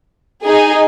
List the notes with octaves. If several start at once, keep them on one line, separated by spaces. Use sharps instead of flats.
D#4 G#4 D#5 G#5